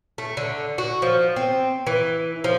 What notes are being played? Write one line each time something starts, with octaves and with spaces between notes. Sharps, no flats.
A3
D3
F#4
F3
C4
E3
F3